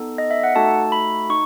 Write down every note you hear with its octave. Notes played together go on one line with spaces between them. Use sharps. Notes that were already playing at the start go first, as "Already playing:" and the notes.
Already playing: B3 D#4 A4
D#5
E5
F#5
A3 D#4 F#4 A4 A5
B5
D#4 C#6